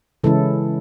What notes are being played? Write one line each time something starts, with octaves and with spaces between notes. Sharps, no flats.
C#3 E3 G#3 C#4 E4 A4